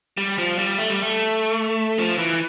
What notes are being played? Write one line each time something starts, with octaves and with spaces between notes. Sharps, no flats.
G3
F3
G3
A3
G3
A3
F3
E3